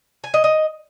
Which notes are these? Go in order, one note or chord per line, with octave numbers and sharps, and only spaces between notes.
G#5
D#5
D#5